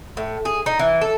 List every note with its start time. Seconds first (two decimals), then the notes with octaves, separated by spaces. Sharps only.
0.17 A2
0.45 G#4
0.66 D#4
0.79 E3
1.01 A4